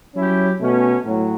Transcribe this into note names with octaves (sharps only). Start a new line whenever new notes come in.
F#3 C#4 E4 G4
B2 A3 C#4
A2 F#3